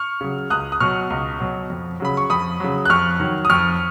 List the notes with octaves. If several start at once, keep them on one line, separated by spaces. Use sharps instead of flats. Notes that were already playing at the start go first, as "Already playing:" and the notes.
Already playing: C#6 F6
C#3 F#3
C#2 D#6 F#6
D#6
B2 F#3 C#6 F6
C#2
B2 F#3
F2
C#3 F#3 B5
C#6
F2 B5 D#6
C#3 F#3
F#6
F2 C#6 F6
D#3 F#3
D#6
F2 C#6 F6